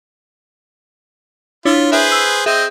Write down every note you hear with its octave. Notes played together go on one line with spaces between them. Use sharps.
D4 E4 F4 C#5
G#4 B4 C5 E5
E6
C4 G#4 D#5 E5